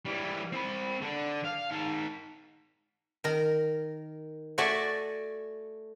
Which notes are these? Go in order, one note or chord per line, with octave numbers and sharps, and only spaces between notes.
E3 G3
C4 B5
D3
F5
D#3 A5
D#3 A#4
A3 F#4 D5 E5 G#5 A5